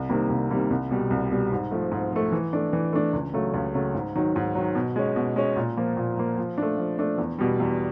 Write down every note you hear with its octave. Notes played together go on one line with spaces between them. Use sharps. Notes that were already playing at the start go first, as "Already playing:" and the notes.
Already playing: C2
C3 D#3 G3 A#3
C2
C3 D#3 G3 A#3
C2
B2 G3
C2
B2 G3
G#2
F3 A3
G#2
F3 A3
E3
A3 D4
E3
A3 D4
C#2
C#3 F#3 A3
C#2
C#3 F#3 A3
G#2
D#3 F#3
G#2
D#3 F#3
B2
G#3 C#4
B2
G#3 C#4
A#2
F3 A#3
A#2
F3 A#3
F3
A3 D4
F3
A3 D4
E2
B2 G3
E2